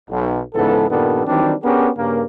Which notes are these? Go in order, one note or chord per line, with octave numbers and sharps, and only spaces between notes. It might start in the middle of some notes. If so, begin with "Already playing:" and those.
B1
C#2 G#2 E3 B3 A4
G2 A#2 D#3 G3 B3 A4
D#3 E3 F#3 G3 C4 D4
B3 C#4 D4 G4 G#4 A#4
G2 C#3 A#3